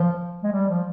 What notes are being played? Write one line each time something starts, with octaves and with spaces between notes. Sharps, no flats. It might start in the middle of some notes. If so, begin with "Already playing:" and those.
Already playing: F3
G#3
G3
F3